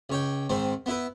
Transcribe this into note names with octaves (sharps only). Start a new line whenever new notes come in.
C#2 C#5 G5
G#2 D#3 C4
B3 E4 B4